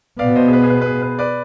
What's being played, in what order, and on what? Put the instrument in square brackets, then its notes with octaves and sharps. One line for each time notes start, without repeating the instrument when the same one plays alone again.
[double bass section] B2 B3 [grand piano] D5 F5
[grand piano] C5 D#5
G#4
B4
G#4
B4
B4
G#4
B4
B4 D5